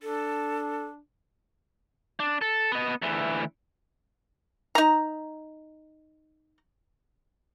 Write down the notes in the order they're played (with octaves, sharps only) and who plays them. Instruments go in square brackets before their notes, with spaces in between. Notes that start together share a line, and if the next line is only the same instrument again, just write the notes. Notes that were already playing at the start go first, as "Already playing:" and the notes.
[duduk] D4 [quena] A4
[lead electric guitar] D4
A4
B3 D#5
D2 E3
[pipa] D#4 A#5